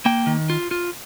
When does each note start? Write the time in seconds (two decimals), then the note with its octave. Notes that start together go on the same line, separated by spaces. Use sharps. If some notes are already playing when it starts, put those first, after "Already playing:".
0.06 A#3 G5
0.27 D#3
0.50 F4
0.71 F4